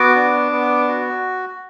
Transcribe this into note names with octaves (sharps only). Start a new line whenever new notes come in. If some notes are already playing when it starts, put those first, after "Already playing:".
Already playing: B3 F#4 D6
D4
B3
F#4